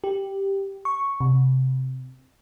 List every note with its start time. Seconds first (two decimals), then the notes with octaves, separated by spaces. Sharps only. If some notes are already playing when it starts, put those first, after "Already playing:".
0.04 G4
0.85 C#6
1.21 C3